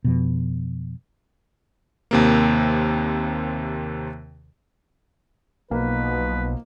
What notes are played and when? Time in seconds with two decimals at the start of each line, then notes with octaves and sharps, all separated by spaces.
0.04 F2 B2
2.11 D#2 C3 A#3
5.71 B1 B2 F3 A#3 D#4 B4